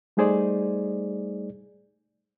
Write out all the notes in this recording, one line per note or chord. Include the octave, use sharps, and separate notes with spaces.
G3 A3 D#4 G#4 C5 D5